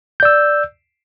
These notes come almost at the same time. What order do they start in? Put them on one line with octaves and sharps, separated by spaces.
G6 D5 E6